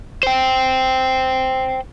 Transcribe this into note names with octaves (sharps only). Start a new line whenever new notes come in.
C5 G5